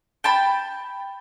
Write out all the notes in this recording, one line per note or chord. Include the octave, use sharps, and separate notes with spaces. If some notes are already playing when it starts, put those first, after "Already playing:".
G5 A5 B5